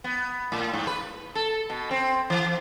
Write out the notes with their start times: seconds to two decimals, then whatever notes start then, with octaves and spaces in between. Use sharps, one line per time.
0.04 B3
0.52 A2
0.73 G#2
0.87 B4
1.35 A4
1.70 B2
1.91 C4
2.30 E3